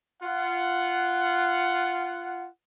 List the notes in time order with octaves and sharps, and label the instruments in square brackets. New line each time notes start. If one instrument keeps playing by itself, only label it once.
[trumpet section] F4 F#5